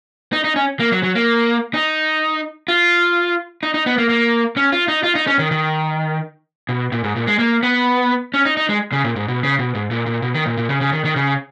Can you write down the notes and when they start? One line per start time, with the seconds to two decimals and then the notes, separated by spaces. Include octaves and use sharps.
0.33 D#4
0.44 D#4
0.56 C#4
0.80 A#3
0.92 F#3
1.03 F#3
1.15 A#3
1.74 D#4
2.68 F4
3.63 D#4
3.74 D#4
3.86 B3
3.98 A#3
4.09 A#3
4.57 C#4
4.72 F4
4.88 D#4
5.03 F4
5.15 D#4
5.27 C#4
5.39 D#3
5.51 D#3
6.69 B2
6.92 A#2
7.04 G#2
7.16 A#2
7.27 G#3
7.39 A#3
7.63 B3
8.34 C#4
8.45 D#4
8.57 D#4
8.69 G#3
8.93 C#3
9.04 A#2
9.16 G#2
9.28 B2
9.43 C#3
9.59 B2
9.75 G#2
9.91 A#2
10.06 A#2
10.22 B2
10.34 D#3
10.46 A#2
10.57 A#2
10.69 C#3
10.81 C#3
10.93 D#3
11.05 D#3
11.16 C#3